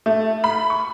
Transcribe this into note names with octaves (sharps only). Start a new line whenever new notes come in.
A3
B5
C#6